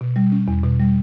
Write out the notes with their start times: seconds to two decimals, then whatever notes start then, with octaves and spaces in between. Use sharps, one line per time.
0.01 B2
0.16 G3
0.32 C#4
0.48 E2
0.63 B2
0.80 G3